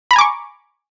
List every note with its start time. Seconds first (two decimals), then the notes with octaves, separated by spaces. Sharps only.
0.11 B5
0.13 A#5
0.16 G#5
0.18 D6
0.21 C#6